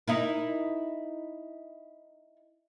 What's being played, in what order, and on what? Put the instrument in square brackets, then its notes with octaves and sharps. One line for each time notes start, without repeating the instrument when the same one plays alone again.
[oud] D#4 E4 A#4